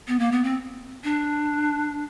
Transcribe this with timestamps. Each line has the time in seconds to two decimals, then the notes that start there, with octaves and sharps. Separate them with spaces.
0.08 B3
0.19 A#3
0.32 B3
0.44 C4
1.04 D4